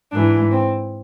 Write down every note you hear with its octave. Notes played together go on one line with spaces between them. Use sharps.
G#2 E3 D4
C4